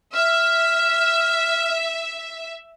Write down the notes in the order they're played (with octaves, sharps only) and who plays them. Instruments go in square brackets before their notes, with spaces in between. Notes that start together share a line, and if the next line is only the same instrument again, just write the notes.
[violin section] E5 [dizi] F6